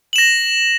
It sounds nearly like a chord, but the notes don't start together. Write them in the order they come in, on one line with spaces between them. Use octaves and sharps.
F#7 E7 A#6